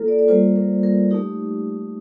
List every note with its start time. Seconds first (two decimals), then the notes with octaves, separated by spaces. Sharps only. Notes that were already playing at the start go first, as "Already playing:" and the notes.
Already playing: A#3 F4 A4 A#4
0.08 D5
0.19 D5
0.28 G3 A#3 F4 C5
0.56 A#4
0.83 A#4
1.11 A3 D#4 G4